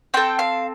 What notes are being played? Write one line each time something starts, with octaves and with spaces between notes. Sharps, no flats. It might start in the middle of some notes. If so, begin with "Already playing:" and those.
C4 A4 G5
F5